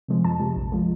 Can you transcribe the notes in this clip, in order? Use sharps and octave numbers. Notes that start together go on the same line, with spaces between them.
C3 F3 G#3
F2 A5
C3 F3 G#3
A#1
F3 G#3